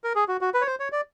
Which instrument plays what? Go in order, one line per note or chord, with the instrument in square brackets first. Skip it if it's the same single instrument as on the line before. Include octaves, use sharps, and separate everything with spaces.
[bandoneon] A#4
G#4
F#4
F#4
B4
C#5
C5
C#5
D5